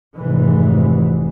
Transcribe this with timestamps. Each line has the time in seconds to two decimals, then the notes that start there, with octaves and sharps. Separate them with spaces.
0.16 F1 G#2 E3